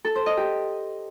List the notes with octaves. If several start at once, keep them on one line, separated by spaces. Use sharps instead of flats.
A4
C5
D#5
G4